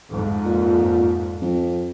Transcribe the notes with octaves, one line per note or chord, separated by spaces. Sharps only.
F2 G#2
A#2
F2